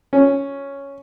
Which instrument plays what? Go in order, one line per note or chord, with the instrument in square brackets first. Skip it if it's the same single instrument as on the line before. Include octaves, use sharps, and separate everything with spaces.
[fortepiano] C#4